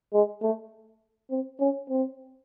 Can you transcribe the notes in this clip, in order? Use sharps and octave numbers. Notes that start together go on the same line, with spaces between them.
G#3
A3
C4
C#4
C4